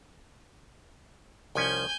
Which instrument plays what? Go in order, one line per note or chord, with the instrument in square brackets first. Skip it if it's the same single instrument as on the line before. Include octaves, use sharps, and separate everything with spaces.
[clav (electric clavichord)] C2 F3 C#4 [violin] G#5 G6